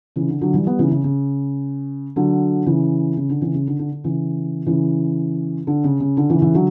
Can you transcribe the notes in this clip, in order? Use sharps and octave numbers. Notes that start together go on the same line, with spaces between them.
C#3 E3
D3
D3 F#3
E3 G3
G3 B3
C#3 E3
C#3
C#3
D3 F#3
C#3 E3
C#3
D3
C#3 E3
C#3
D3
D3
D3
C#3 E3
C#3 E3
D3
C#3
C#3
D3
C#3 E3
C#3 E3
D3 F#3